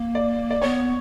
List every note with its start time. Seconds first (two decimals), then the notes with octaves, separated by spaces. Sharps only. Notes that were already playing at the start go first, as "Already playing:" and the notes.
Already playing: A#3
0.15 D5
0.50 D5
0.62 B3 C#5